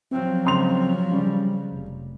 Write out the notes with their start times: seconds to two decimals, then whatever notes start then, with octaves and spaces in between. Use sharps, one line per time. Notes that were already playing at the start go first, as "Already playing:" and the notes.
0.11 F3 F#3 C4
0.45 C#2 C6 F7
1.12 C#3 G3
1.72 F1